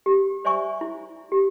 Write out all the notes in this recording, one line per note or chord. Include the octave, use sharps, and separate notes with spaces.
G4
C5 D5 E5 G#5 C#6
E4
G4